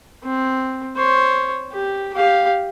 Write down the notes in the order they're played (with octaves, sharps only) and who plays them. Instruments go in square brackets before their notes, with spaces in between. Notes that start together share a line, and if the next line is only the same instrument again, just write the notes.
[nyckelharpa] C4
C5 C#5
G4
G4 F5